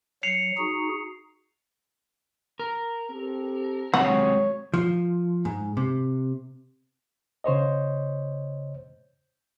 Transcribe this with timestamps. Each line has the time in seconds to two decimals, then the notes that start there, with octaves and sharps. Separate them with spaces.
0.23 F#3 C7 C#7 F7
0.57 D#4 F#4 G#4
2.60 A#4
3.10 C4 G4 A4
3.94 F#3 G#3 C4 C#5 F#5
4.74 F3
5.45 G#2
5.77 C3
7.44 C#3 C5 C#5 D#5